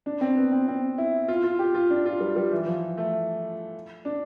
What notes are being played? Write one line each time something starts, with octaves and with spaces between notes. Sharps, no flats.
D4
C4
B3
C4
C4
E4
F4
F4
G4
F4
D4
F4
G3
G3
E3
F3
A3
D4